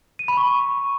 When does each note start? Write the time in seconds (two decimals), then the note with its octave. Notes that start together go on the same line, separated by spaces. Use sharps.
0.19 D#7
0.28 B5
0.37 C#6